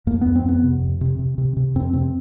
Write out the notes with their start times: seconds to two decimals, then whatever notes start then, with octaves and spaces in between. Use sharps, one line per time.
0.07 F2 A#3
0.21 F2 B3
0.36 C4
0.45 F2 B3
0.64 C3
0.81 F2
1.01 C3
1.19 C3
1.38 C3
1.57 C3
1.75 F2 C4
1.93 C3 C4